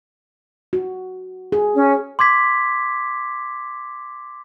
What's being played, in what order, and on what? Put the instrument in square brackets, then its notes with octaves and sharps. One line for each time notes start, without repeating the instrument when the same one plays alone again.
[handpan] F#4
G#4
[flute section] C#4
[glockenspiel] C6 D6 G#6 B6